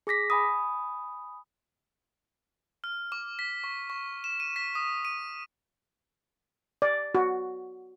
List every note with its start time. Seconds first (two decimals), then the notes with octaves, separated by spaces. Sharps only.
0.07 G#4 D6 A#6 B6
0.30 G#5 B5 D#6
2.84 F6
3.12 D6
3.39 B6
3.64 C#6
3.90 C#6
4.24 E7
4.40 D#7
4.56 B6
4.75 D#6
5.05 D#7
6.82 D5
7.15 F#4